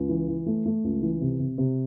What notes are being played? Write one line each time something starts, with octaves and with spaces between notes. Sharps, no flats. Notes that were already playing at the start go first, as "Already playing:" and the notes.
Already playing: C#2
E3
E3
A3
A3
C#2
E3
C3
C3
C3